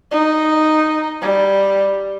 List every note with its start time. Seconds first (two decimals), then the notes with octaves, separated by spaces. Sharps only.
0.11 D#4
1.22 G3